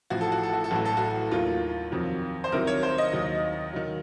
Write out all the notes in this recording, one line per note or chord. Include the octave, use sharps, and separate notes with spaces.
A1 A2 F3 F#4
A4
F#4
A4
F#4
A4
A1 A2 F#3 F#4
A4
F#4
D#2 D#3 F#3 F4
F2 D#3 F#3
C5
C2 C3 D#3 F#3 A#4
C#5
C5
D#5
D#2 D#3 F#3
D#3 F#3